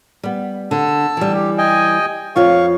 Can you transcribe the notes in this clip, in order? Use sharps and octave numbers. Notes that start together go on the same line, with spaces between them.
G3 B3
D3 A5 E6
E3 G3
G4
D#5 G5 G#5
F2 F4 C#5 F5 C#6